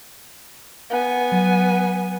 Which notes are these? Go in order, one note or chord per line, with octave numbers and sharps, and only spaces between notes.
B3 G#5
F#3